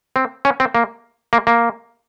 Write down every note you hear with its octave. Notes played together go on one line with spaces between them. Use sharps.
C4
C#4
C4
A#3
A#3
A#3